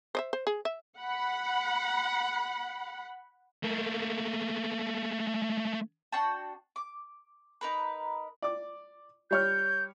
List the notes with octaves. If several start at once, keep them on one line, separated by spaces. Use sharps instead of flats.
C5 D#5 E5
C5
G#4
E5
F#5 B5
A3 A#3
D4 F#4 G5 A5
D6
D#4 A#4 B4
D5 D6
G3 C#5 F6 G6